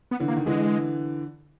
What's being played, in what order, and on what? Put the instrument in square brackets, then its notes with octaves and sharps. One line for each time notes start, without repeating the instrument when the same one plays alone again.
[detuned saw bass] B3
[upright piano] D3 E3
[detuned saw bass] A#3
[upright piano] D#3
[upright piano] D3 E3 [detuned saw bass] G#3